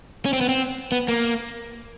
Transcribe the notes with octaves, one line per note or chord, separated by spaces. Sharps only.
C#4
C4
B3
C4
B3
A#3